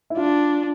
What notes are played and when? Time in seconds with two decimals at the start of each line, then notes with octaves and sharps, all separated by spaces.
0.10 E4
0.17 D4 F4